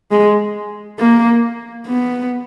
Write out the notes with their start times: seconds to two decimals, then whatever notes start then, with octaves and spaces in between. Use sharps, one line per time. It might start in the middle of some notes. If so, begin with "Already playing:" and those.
0.11 G#3
0.99 A#3
1.86 B3